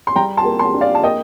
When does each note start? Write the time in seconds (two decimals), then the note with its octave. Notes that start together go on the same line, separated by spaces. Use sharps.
0.07 C6
0.16 G3 G5 A#5
0.37 A5 C6
0.45 A#3
0.59 A5 C6
0.74 D4
0.81 D5 F5
0.95 A5
1.03 A#3 D#5 G5